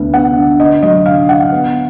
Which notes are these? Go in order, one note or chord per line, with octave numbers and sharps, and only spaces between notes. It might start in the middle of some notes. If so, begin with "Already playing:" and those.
Already playing: D2 B3
B3 F#5
D3
D3 D#5
F#3 D#5
D3 F5
D3 F#5
B3